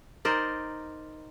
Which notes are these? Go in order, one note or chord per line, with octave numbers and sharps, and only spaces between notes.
D#4 A#4 C5 D5